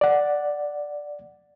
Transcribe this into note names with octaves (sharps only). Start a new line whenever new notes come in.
D5 F#5